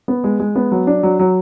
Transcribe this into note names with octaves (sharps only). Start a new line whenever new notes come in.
B3
G#3
G#3
B3
F#3
D4
F#3
F#3